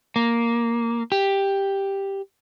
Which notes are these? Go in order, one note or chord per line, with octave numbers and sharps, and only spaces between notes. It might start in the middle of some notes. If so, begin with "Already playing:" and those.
A#3
G4